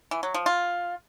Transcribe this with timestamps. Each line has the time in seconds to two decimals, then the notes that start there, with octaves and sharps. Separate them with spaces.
0.11 E3
0.23 F#3
0.34 F3
0.46 F4